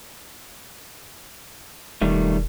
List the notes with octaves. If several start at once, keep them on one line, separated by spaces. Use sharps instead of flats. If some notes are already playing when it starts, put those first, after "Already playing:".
E1 D#3 G3 A3